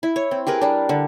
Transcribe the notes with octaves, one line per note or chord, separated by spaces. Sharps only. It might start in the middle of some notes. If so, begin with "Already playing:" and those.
E4
C#5
C4
G4 G#4 A#4 B4
G3 D4
D3